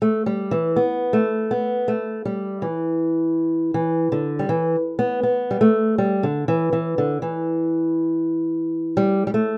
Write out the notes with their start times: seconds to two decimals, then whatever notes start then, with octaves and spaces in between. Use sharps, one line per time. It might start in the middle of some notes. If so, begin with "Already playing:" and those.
0.02 A3
0.26 G3
0.51 E3
0.76 B3
1.13 A3
1.51 B3
1.88 A3
2.25 G3
2.62 E3
3.74 E3
4.12 D3
4.39 G3
4.49 E3
4.99 B3
5.23 B3
5.51 G3
5.61 A3
5.98 G3
6.23 D3
6.48 E3
6.73 E3
6.98 D3
7.22 E3
8.97 G3
9.27 G3
9.34 A3